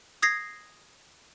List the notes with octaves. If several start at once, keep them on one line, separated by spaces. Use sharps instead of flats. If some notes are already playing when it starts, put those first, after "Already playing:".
D#6 G#6 A#6 C7